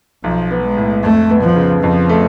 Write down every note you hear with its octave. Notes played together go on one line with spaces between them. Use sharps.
B1 F3
B3
G#3
A2
F2 A3
B3
F3
C#3
F2 F3
A3